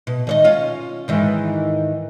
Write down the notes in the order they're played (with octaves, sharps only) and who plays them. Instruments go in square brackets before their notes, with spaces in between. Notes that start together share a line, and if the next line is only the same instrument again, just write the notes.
[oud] B2
D#3 C#5 D#5
C#4 F4
G#2 D#3 E3